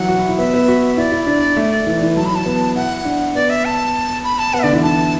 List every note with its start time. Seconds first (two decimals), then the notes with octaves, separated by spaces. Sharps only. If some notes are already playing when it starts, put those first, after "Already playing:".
Already playing: E3 F#3 F#5
0.09 F#4
0.18 E4
0.29 E4
0.38 B3 E5
0.54 B3
0.68 F#4
0.97 E4 D5
1.12 E4
1.27 D4
1.57 A3
1.87 E3
2.01 E3
2.16 F#3 A5
2.25 B5
2.31 E3 A5
2.46 B3
2.76 E4 F#5
3.05 D4
3.35 B3 D5
3.50 E5
3.65 A5
4.24 B5
4.39 A5
4.54 B3 F#5
4.59 E5
4.63 D3 D5
4.73 E3
4.83 E3 A5